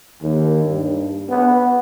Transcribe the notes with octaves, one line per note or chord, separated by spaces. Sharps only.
D#2
G2
B3